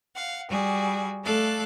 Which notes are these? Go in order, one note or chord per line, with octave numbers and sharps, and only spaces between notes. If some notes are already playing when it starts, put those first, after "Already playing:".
F5 F#5
G3 F#4 G#4
A3 A4 D5 F5 F#6